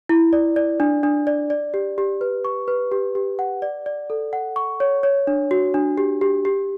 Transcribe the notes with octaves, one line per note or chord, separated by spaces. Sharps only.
E4
D5
D5
D4
D4
D5
D5
G4
G4
B4
C#6
B4
G4
G4
F#5
D5
D5
A4
F#5
C#6
C#5
C#5
D4
F#4
D4
G4
G4
G4